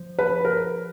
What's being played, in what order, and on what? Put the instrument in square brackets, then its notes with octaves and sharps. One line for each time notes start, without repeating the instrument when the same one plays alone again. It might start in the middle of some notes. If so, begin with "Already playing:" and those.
Already playing: [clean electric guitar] F3
[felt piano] B4
A#4